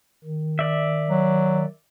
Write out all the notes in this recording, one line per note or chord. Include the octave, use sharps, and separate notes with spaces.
D#3
D5 E5
F#3